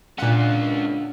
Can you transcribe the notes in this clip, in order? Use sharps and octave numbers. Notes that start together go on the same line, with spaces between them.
A#2 C#3 D4 F4 F#5